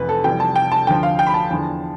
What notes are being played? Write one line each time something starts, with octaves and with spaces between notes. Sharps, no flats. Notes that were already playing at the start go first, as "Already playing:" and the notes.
Already playing: F1 F2 E3 B4
A4
F1 F2 E3 G3 G5
A5
G5
A5
D2 D3 F3 G5
F5
G5
B5
A5
E2 D3 F3